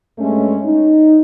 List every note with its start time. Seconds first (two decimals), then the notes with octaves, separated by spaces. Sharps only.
0.19 G2 G#3 A3 C#4
0.66 D#4